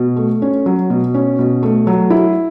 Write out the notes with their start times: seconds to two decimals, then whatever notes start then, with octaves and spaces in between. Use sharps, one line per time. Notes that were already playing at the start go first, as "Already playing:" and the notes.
Already playing: B2
0.17 A3
0.42 C#4
0.66 F#3
0.90 B2
1.14 C#4
1.39 B2
1.63 A3
1.87 F#3
2.10 E4